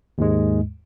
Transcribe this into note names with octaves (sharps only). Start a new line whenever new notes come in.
D#2 G#2 G#3